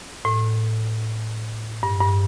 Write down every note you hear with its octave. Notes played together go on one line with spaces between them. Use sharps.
A2
G2
G2